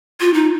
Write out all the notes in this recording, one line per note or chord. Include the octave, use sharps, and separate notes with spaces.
F4
D#4